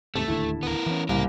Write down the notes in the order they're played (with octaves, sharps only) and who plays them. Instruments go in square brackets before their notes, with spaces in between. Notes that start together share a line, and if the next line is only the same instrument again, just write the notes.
[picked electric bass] D#2 G#2 C3 [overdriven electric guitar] A3 [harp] A5
[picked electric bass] D1 D#2 D3 [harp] E4
[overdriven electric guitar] B3 A#4
[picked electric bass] E3 C#4
[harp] C2 [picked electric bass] A2 C#3 [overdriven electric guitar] A#3 A#4